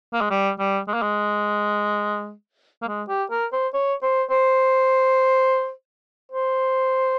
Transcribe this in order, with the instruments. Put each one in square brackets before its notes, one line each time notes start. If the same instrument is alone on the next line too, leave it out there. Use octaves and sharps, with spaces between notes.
[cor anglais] A#3
G#3
G3
G3
G#3
A#3
G#3
A#3
G#3
G4
A#4
C5
C#5
C5
C5
C5